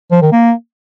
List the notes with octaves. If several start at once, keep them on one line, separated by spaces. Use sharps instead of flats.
F3
D#3
A#3